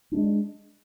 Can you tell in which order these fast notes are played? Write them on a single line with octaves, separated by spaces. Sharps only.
D4 A3 G#3